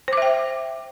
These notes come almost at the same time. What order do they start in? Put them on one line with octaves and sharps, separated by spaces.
C5 D6 E5 G5